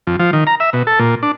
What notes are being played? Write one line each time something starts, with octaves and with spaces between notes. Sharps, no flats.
F2
F3
D#3
A#5
E5
B2
A4
A#2
D4